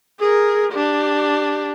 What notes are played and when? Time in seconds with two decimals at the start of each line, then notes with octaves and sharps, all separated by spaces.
0.19 G#4 A#4
0.72 D4 G4